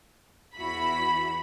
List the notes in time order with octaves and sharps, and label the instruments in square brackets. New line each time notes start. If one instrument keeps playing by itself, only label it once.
[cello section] E2 E4 F#4 [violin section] B5